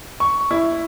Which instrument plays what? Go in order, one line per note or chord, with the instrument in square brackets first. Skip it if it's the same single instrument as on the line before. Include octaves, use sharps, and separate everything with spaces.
[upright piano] C#6
E4